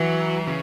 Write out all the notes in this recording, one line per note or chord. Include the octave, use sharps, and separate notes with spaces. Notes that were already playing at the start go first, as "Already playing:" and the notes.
Already playing: E3 F#3
C#3